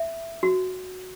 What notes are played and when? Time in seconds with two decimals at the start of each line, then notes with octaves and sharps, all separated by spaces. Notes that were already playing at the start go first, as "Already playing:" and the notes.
Already playing: E5
0.43 F#4